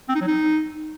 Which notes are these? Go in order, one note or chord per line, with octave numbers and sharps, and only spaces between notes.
C4
D#4
F#3
D#4